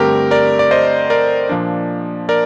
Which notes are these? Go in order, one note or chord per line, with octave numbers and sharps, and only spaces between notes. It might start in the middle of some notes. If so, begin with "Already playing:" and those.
Already playing: G2 D3 A3 C4 G4 A#4
A#4 D5
D5
C5 D#5
A#4 D5
A#2 F3 A#3 D4
A#4 D5